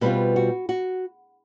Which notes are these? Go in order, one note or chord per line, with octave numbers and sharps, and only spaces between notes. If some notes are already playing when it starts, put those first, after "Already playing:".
B2 G3 C4 F4 B4
F#4
F#4